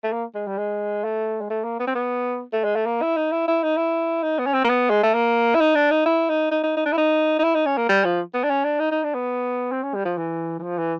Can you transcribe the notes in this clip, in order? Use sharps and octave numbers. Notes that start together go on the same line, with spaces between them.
A3
A#3
G#3
G3
G#3
A3
G#3
A3
A#3
B3
C4
B3
A3
G#3
A3
A#3
E4
D#4
E4
E4
D#4
E4
D#4
B3
C#4
C4
A#3
B3
G#3
A3
A#3
E4
D#4
D4
D#4
E4
D#4
D#4
D#4
D#4
D4
E4
D#4
D#4
E4
D#4
C#4
A#3
G3
F3
B3
D4
C#4
D4
D#4
D#4
D4
B3
C4
C#4
G3
F3
E3
E3
F3
E3